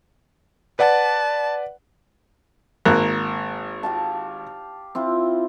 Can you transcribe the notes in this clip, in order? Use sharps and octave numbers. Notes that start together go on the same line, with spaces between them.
B4 D5 F#5 A5
G#1 A#3 F#6
G4 F5 A5
C4 E4 F4